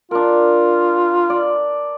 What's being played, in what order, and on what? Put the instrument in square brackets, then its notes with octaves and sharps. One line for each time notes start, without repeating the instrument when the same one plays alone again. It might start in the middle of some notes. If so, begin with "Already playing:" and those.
[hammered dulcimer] D4 A#4 [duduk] F4
[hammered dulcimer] D5